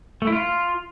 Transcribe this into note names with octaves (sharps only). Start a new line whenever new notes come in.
A3
E4
F4